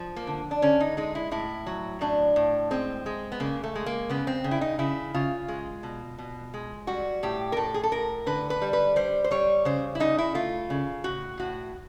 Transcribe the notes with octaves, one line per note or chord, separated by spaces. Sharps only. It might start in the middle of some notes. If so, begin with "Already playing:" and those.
Already playing: F3
A#3
D3
D4
D3 C#4
D#4
G#3 D#4
E4
A2 E4
F#3
A2 D4
A2
G#3 C4
G#3
B3
C#3 A#3
A3
G#3
A#3
C#3 B3
C4
C#3
E4
D#4
C#3 E4
C#3 F4
G#3
B2
B2
G#3
G3 F#4
A2 G4
A#4
A2 A4
G#4
A4
A2 A#4
D3 B4
B4
G3
B4
G3 C5
C5
G3 C#5
C#3 C5
E4
C#3 D#4
E4
A3 F4
C#3
A2 F#4
A2 F#4